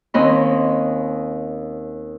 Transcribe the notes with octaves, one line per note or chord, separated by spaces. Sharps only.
D#2 C4 C#4 D#5 B5 C6